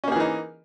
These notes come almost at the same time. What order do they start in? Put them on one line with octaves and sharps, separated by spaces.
C#4 A#3 G#4 E3 D#4